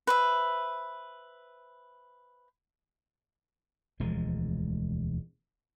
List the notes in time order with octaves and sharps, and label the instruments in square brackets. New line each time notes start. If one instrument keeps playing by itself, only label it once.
[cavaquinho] B4 C5 E5
[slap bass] E1 D2 F3 G#3